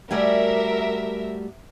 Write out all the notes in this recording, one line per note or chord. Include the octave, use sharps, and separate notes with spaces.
G3 A3 F#4 A#4 D5 E5 G#5